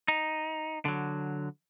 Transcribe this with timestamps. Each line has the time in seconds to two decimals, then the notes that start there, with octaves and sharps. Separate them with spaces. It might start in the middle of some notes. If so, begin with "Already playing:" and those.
0.08 D#4
0.85 D3 F#3